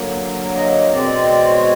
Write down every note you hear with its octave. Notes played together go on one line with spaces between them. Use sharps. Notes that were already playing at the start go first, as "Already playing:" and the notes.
Already playing: D3 F#3 A#3
D#5
B2 G#3 C4 D5
D#5
D5
C#5